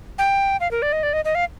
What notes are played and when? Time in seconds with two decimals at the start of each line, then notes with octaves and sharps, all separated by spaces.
0.18 G5
0.60 F5
0.71 A#4
0.82 D5
0.93 D#5
1.03 D5
1.13 D#5
1.25 D#5
1.35 F5